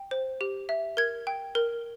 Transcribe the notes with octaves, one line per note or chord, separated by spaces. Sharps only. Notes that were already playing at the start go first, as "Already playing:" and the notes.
Already playing: G5
C5
G4
E5
A#4 G#6
G5
A#4